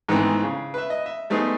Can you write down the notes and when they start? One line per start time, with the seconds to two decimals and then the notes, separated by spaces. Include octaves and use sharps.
0.09 G#2 D#3 E3 A3 B3 C4
0.43 C#3
0.74 B4 E5
0.90 D#5
1.06 E5
1.30 G3 A3 B3 D#4 G#4 C5